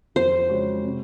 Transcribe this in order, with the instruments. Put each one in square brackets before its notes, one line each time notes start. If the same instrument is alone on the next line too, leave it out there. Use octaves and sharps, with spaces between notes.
[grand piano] F2 [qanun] C5
[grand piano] C#3 G#3 C#4 F#4
C3